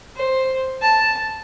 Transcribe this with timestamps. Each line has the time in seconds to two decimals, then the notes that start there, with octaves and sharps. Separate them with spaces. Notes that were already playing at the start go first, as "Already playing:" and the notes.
0.16 C5
0.82 A5